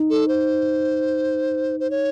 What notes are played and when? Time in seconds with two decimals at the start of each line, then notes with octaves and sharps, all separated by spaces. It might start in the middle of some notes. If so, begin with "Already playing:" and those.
Already playing: D#4
0.10 A4
0.28 C5
1.80 C5
1.91 C#5